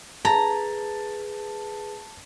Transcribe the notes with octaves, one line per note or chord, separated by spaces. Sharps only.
G#4 B4 A5 A#5